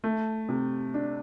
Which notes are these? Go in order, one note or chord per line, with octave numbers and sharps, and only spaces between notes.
A3
C3
D4